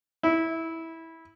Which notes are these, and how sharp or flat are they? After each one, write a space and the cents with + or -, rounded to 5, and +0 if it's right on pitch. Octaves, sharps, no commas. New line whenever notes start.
E4 -15